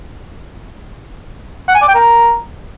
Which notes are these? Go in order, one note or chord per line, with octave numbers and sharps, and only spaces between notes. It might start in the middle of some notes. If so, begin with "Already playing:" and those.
F#5
G#5
D5
G5
A#4